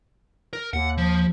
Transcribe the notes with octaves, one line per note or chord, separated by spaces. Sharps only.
A#4
D#2 F#5
F3